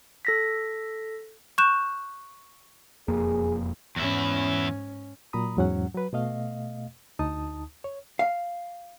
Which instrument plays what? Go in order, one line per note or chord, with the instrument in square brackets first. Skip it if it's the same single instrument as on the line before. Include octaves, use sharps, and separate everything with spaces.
[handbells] A4 A#6 B6
[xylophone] C#6 F#6 G6 E7
[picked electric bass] E1 F2 A#3 [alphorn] G#4
[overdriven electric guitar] E2 E4 [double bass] G#2 C#4
[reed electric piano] A#2 F#3 A#5 B5 D#6
E2 G#2 F#3 C#4 F#5
F#3 B4
B2 A3 D#5 F5
D2 D#4 A5 D#6
C#5
[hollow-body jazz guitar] F5